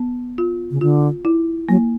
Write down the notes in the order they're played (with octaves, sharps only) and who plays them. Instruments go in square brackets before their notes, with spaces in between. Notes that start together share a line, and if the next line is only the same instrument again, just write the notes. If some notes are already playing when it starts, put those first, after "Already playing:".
Already playing: [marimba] B3
F4
[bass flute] C#3
[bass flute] D3 [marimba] F4
[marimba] E4
[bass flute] F#3 [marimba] A#3